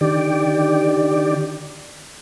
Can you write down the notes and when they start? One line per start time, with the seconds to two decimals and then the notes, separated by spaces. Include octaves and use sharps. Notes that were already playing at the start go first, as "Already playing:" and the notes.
0.01 D3 D#3 G4 D5